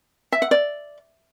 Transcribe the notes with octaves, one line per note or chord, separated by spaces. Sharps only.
E5
F#5
D5